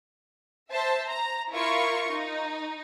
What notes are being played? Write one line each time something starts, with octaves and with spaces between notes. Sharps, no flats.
C5 E5 A5
A#5
E4 F4 A#4 C#6
D#4